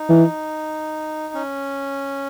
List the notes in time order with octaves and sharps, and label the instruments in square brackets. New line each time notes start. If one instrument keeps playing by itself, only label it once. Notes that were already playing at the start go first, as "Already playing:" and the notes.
Already playing: [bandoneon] D#4
[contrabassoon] E3
[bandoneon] C#4